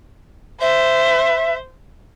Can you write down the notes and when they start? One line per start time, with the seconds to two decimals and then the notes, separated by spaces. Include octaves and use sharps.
0.61 C5 E5